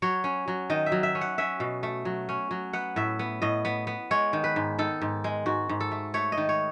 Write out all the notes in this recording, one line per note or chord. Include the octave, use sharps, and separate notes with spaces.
F#3 C#5
C#4
F#3
D#3 D#5
E5
F#3
E5
C#4
F#5
C#4 E5
B2
A3
F#3
C#4
F#3
B3 F#5
A2 E5
B3
A2 D#5
B3
B3
G#3 C#5
D#3
B4
G#2
D#3 A4
G#2
G#3
G#2 F#4
G#2
A4
A3
A3 C#5
D#5
D#3
C#5